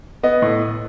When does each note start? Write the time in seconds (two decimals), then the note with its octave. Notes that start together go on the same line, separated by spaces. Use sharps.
0.23 B3 D#5
0.42 A2